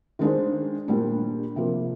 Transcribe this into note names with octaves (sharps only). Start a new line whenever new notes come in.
D#3 G#3 D4 G#4 C5
A#2 G3 D4
C3 F3 A#3